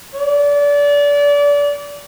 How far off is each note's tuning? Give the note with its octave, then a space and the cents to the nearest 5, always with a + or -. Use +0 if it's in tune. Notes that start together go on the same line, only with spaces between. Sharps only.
D5 -30